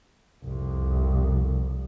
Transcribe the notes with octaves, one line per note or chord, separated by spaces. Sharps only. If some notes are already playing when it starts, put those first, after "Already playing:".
C2 F2